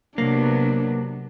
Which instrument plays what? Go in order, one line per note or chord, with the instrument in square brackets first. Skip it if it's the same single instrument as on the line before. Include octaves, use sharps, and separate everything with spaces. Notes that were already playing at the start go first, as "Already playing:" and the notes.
[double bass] C3 [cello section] F#3 B3 [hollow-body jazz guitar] A#3 [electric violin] D4